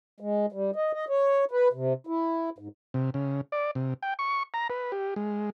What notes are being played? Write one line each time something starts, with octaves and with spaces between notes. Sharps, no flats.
G#3
G3
D#5
D#5
C#5
B4
C3
E4
G#2
C3
C#3
D5
C3
G5
C#6
A#5
B4
G4
G#3